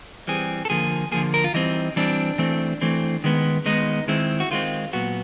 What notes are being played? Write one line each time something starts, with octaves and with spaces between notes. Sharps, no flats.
E3 G3 C4 G#4
A4
D3 F3 A#3 G#4
D3 F3 A#3 G#4
A#4
F4
E3 G3 C4 D#4
E3 G3 C4 D4
E3 A3 C4
E3 A3 C4
D#3 G#3 B3
D#3 G#3 B3 D#4
D#3 G#3 C4 E4
F#4
D#3 G#3 C4 F4
A#2 F#3 B3 F#4